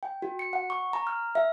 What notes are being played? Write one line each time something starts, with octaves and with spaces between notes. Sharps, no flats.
G5
F#4
C#7
F#5
C#6
A#5
F6
E5